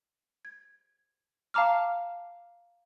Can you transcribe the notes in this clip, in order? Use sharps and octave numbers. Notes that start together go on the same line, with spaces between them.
G#6
F5 A5 A#5 D6 F6